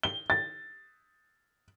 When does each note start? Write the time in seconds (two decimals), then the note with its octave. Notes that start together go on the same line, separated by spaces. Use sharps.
0.03 G7
0.30 A6